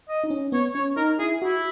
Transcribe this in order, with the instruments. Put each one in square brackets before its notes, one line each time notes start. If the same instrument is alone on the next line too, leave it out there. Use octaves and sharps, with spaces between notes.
[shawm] D#5
[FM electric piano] D#4
C#4
[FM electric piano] B3 [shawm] C#5
[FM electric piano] C#4 [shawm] C#5
[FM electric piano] D#4 [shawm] A#4
[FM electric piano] E4 [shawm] G#4
[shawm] E4 [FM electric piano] F#4